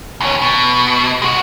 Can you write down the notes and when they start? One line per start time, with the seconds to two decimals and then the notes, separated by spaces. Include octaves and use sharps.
0.21 D#2 C#4
0.42 B2
1.22 G#3 F#4